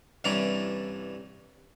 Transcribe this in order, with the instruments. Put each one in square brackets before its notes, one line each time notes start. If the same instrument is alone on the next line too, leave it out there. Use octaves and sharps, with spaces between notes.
[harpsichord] C2 G2 E3 C#4 D5 A#5